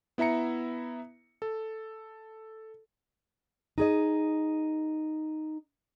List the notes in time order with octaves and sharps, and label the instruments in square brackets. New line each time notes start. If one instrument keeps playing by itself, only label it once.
[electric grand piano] B3 E4 E5 A#5 C#7
A4
[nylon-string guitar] D#4 G#4 D#5